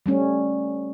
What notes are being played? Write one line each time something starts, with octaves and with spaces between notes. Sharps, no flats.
G3 A3 C#4